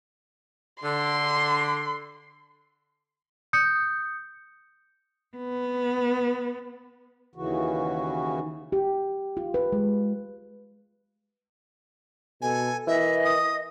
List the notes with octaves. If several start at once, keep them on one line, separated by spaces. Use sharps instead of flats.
D3 C6
D#6 G6 C#7
B3
D#2 C#3 E3 F#4
G4
F4
B4
G#3
B2 A4 G#5
E3 A#4 D#5 E5
D#6